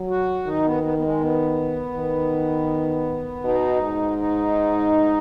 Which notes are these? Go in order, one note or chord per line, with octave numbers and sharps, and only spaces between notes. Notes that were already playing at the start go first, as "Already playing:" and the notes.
Already playing: F#3
F#4
D#3 D#4
B3
B3
B3
G#3
B3
D#3
B2 D#4
G#2
D#4